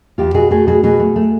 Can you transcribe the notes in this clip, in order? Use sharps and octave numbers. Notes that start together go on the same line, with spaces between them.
E2 F4 G4
B2 F#4 G#4
A3 F#4 G#4
B2 F#4 G#4
B2 F#4 G#4
A3
A3